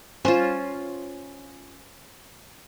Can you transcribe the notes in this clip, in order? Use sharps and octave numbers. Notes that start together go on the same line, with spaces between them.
C#4 F4 C5